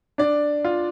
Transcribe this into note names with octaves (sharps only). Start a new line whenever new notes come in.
D4 D5
F4